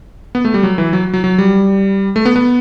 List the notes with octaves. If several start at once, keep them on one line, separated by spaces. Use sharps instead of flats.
B3
A3
G3
F#3
E3
F#3
F#3
F#3
G3
A3
B3
B3